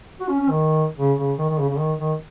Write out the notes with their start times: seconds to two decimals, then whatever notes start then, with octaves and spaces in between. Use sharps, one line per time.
0.20 F#4
0.29 C#4
0.39 C#4
0.49 D#3
0.99 C#3
1.19 C#3
1.39 D#3
1.49 D#3
1.58 C#3
1.69 C#3
1.79 D#3
1.99 D#3